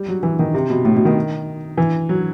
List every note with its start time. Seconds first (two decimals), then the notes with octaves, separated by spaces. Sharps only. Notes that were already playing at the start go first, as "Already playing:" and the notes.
Already playing: G3
0.08 F#3
0.23 E3
0.39 D#3
0.54 C3
0.70 B2
0.85 A2
0.95 B2
1.05 D#3
1.77 E3
2.09 F#3